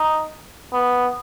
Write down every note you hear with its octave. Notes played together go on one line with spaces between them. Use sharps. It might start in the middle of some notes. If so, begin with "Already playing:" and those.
Already playing: D#4
B3